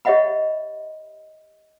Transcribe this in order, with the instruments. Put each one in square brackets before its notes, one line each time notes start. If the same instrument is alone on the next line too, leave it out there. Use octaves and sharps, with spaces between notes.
[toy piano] G4 C#5 D#5 E5 F#5 B5